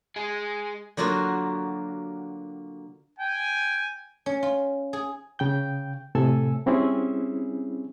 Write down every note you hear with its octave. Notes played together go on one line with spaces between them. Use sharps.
G#3 G#5
D3 F#3 A#3 F4 F#4
G5 G#5
C#4
F4
G#4
C#3 G5 G6
A2 C3 A4 G#5 E6
G3 C4 C#4 E4 G#4